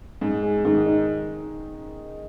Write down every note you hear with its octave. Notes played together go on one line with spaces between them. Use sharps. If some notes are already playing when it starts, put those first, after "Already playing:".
G#2 G#3
G#4
G#2 D#3
D#4